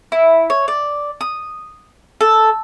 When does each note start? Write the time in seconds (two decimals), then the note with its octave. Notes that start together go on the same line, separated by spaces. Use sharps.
0.12 E4
0.50 C#5
0.68 D5
1.21 D#6
2.21 A4